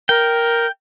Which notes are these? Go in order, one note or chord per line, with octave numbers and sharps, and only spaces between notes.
A#4 G5